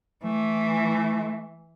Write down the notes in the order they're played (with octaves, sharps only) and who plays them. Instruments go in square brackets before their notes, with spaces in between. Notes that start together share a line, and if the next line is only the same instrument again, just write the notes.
[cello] E3 [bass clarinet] A3